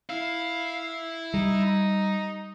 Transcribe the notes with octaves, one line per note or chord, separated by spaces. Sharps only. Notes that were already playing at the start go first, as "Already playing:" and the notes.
E4 F5
G3 D#4